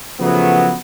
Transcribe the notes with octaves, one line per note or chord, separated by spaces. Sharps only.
C#3 F3 F#3 A3 B3